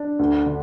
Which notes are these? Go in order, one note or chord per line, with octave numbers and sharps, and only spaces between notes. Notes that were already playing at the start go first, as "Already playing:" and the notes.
Already playing: D4
D2
D3